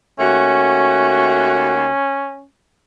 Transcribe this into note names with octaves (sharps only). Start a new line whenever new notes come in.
D#2 A3 C#4 F#4